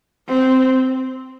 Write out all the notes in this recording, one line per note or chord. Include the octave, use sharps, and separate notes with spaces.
C4